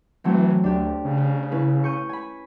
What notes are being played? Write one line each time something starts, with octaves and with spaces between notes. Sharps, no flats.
E3 F#3 A3 C4
D2 D4 G4
C#3
C#4 E4 B4
C#6 G6 D#7
G#5 B5